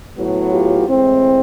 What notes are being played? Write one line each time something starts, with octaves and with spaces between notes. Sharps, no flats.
A2 F#3 B3
F4 G4
A2 E3 G#3 C4